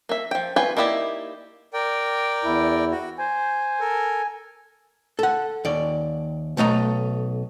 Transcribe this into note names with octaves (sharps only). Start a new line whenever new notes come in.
A#3 E5
F3 G5
F4 B4 G5 G#5
A#3 D#4 E4 G4 D5
A#4 D5 G5
E2 E4
F#4
C5 G#5
A4 A#4
A4 F#5
D#2 D5
B1 A3 D#5 A#5